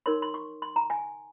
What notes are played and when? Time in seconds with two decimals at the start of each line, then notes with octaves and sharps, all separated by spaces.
0.06 D#4 A#4 C#5 C6
0.22 C6
0.34 C#6
0.62 C6
0.76 A#5
0.90 G#5